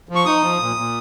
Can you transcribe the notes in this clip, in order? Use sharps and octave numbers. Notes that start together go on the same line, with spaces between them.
F3
C#6
D#4 D#6
F3
A#2
A#2